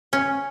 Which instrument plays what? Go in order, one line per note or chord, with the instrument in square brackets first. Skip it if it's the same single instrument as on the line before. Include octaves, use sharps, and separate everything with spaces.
[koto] C#4